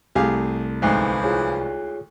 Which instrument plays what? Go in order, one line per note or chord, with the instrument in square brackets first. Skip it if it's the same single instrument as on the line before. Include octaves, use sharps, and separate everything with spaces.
[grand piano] C2 A3 [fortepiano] G4 G#4 F5
[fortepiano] D2 G#2 [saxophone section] E3 F3
[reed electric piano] F4 G#4 C#5